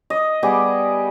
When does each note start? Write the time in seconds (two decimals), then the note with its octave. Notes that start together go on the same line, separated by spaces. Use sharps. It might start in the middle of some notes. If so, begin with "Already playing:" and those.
0.10 D#5
0.43 G3 B3 G4 G#4